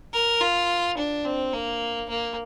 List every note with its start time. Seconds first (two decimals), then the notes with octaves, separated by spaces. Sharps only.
0.13 A#4
0.41 F4
0.98 D4
1.25 C4
1.53 A#3
2.09 A#3